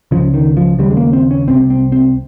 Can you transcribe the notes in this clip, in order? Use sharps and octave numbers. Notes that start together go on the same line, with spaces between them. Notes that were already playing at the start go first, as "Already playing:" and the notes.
C#2 C#3 F3
D#3
F3
D#2 C#3 G3
G#3
A#3
C4
C#4
C2 C3 C4
C4
C4